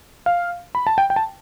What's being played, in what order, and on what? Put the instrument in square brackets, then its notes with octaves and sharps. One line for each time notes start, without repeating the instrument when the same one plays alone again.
[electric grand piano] F5
B5
A5
G5
G5
A5